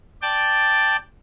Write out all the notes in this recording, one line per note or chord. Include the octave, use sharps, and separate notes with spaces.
D5 G5 A5